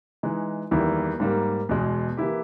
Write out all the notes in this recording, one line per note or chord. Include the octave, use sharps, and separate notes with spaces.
E3 G#3 D#4
E2 D#3 G3 A#3 E4
G#2 G3 A#3
E2 B2 G#3
E3 A#3 E4 G4